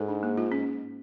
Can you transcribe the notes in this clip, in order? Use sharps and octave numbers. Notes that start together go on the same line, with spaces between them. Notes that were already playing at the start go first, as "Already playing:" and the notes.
Already playing: G#2 A4
D4
A#3
F4
C#4